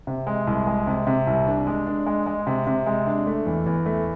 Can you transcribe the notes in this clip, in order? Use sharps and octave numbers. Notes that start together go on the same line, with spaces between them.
C3
G#3
C2
G#3
C3
C3
C2
D4
G#3
D4
G#3
G#3
C3
C3
G#3
D4
A3
E2
E2
A3